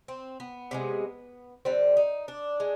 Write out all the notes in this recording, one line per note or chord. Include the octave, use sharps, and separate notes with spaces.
C4
B3
C3 F3 G#3
D3 G3 C4
D#4
D4
G#3